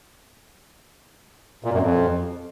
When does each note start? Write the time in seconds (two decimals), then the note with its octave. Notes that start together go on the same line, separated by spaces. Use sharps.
1.64 A#2
1.73 F#2
1.82 F2